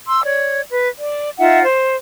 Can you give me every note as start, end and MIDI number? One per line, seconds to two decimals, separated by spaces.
0.08 0.22 84
0.08 0.22 88
0.25 0.62 73
0.25 0.62 74
0.71 0.89 71
0.99 1.29 74
1.39 1.63 63
1.39 1.63 65
1.39 1.63 76
1.39 1.63 78
1.63 1.97 72